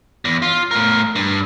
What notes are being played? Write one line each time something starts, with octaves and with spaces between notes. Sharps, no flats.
E2
F4
A2 A#4
G2